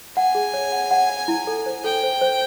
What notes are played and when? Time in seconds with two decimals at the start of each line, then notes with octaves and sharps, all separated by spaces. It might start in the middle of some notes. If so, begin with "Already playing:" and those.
0.16 F#5 G#5
0.35 G#4
0.54 C#5
0.72 F#5
0.91 F#5
1.09 F#5
1.28 E4
1.47 A4
1.66 C5
1.84 A4 G5
2.03 C5
2.21 C5